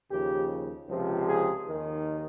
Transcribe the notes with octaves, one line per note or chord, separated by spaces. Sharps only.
D#2 C#3 F3 G4
C#2 C3 F3
G#4
D#2 D#3